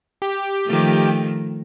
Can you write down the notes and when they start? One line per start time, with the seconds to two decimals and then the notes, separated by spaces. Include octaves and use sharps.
0.22 G4
0.66 D#3 F3 A3